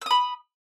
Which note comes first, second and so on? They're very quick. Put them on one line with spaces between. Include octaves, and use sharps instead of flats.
E6 D#6 B5